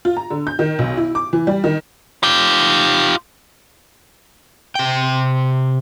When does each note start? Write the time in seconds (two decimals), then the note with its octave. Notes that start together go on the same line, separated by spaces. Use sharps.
0.05 F4
0.17 A#5
0.30 D3
0.47 G6
0.59 D#3
0.79 B1
0.97 E4
1.15 D6
1.33 E3
1.47 G3
1.64 D#3
2.23 F4 G4
4.75 C3 G5